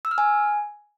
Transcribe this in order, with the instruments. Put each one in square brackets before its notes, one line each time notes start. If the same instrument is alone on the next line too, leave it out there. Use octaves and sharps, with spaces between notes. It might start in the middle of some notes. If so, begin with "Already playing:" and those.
[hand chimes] E6
F6
G#5